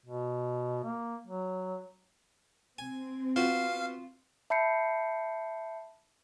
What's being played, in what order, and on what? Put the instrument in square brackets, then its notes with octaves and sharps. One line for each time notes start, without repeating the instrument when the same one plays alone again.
[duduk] B2
A#3
F#3
[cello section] C4 [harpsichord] G#5
[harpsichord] B3 F#4 C5 [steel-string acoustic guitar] F4 [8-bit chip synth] F5
[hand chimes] E5 A5 B5 G6 C7 C#7